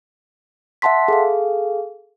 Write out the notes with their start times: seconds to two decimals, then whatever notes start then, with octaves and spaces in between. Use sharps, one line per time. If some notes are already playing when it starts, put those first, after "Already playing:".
0.82 E5 F#5 A5 C6 B6
1.08 G#4 A4 F5